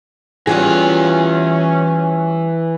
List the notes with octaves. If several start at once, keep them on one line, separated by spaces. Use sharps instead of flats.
E3 G3 C#4 F4 G#4 F#5